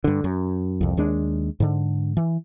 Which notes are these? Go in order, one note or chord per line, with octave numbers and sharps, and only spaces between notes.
G2 D3
F#2
C2 F2
D#2 G#3 D4
G#2 D3
E3